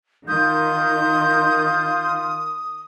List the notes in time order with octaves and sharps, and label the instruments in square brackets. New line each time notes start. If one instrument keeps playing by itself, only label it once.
[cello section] D#3 [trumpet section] F4 [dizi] D#6 [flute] G6